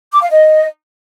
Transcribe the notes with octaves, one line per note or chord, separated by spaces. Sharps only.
D6
F5
D#5